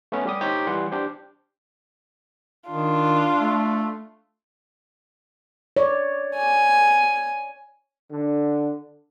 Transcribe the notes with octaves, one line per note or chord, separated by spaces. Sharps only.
A3 B3 C#4
G3 G4 D#6
D#4 G4 C5 C#5
E3 G3 F#5 C6
D4 G4 C5
D#3 D4 F4
A3
C#5 D5
G#5
D3